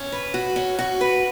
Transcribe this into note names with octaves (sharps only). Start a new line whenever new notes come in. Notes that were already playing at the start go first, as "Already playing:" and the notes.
Already playing: C#4
B4
F#4
C#4
F#4
B4